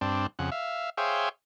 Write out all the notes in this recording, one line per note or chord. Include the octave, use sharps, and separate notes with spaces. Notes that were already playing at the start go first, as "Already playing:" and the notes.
G2 C4 D4
F2 C#3 F#5
E5 F5
G#4 C5 C#5 E5 F5 G5